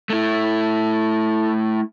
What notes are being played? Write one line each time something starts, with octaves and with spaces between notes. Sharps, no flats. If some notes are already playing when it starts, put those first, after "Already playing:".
A3 E4